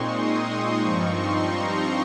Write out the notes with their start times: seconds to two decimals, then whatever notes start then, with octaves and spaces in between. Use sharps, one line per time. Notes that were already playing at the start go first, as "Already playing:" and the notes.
Already playing: A#2 G#3 C4 D#4 C6 C#6
0.14 D#6
0.47 D#6
0.80 G2 F3 C4 D#4 C#6
1.14 C6
1.46 A#5